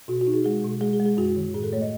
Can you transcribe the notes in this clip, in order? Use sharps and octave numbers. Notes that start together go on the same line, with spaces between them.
B2 F#4
F#4
D#4
G#4
G#3 G#4
B2
G#3 G#4
G#4
G#3
G#4
F#2 F#4
D#3
A2 G#4
A4
A3 C#5
D#5